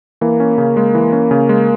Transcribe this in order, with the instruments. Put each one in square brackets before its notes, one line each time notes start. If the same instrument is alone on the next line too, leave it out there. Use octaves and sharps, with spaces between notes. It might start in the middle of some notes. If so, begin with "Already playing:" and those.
[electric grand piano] E3 [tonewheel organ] A#3
[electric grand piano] C#4
C#3
G#3
E3
C#4
C#3
G#3